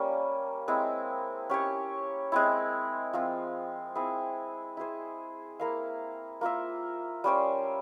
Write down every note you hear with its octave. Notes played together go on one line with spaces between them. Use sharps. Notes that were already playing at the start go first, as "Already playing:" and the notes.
Already playing: G3 A#3 C#4
G#3 C4 E4
C#4 G4 C#5
G#3 C4 E4
F3 C4 F4
C4 E4 G#4
E4 G#4 C5
A#3 E4 A#4 F5
A#3 F4 A#4 E5
G3 C#4 G4 C5